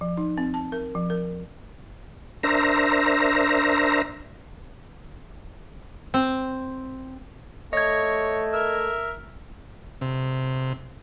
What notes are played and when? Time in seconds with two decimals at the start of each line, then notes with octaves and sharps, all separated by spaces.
0.01 F3
0.17 D#4
0.38 C4
0.54 A5
0.72 A#4
0.95 F3
1.10 A#4
2.43 D4 A#4 C5 E5 A#5
6.14 C4
7.73 A3 C#5 D#5 G#6
8.53 A#4 E5
10.01 C3